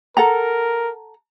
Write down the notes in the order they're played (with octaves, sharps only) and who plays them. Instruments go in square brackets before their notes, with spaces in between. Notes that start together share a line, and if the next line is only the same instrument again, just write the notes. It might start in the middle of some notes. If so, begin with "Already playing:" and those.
[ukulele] A4 F#5 A#5 [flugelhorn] A#4